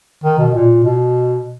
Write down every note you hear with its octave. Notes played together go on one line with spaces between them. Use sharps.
D#3
B2
A#2
B2